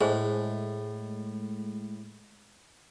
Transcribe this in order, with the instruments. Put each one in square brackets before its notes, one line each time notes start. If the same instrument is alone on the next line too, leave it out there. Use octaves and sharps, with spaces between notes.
[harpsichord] A2 [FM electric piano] G#3 A3 [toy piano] G#4 C5